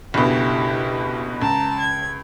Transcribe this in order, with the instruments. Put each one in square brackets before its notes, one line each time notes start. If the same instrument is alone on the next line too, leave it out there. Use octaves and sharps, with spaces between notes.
[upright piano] F#1 D2 B2 [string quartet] E4 G4
[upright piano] C#2 [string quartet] A5 A#5
[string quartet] G#6